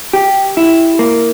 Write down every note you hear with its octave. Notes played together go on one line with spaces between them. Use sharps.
G4
E4
A#3